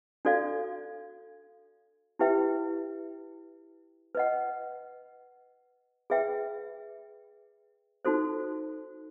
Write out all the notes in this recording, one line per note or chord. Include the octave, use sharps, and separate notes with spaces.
D4 F#4 A4 D5 F5
E4 G4 B4 E5 G5
B4 D#5 F#5
G#4 B4 E5 G5
D#4 F#4 A4 C5